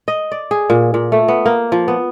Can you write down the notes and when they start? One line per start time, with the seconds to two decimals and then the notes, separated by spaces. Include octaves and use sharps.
0.08 D#5
0.31 D5
0.51 G#4
0.70 A#2
0.94 A#2
1.12 A3
1.28 B3
1.46 A#3
1.72 F3
1.88 B3